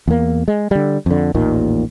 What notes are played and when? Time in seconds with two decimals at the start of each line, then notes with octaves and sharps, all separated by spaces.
0.08 E2 A#3
0.48 G#3
0.71 D3 G3
1.06 F2 D3
1.34 A1 D#2 A#2 D#3